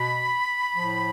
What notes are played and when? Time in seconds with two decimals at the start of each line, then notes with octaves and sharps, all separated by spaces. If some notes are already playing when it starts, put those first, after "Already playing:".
Already playing: B2 B5
0.74 A2 F3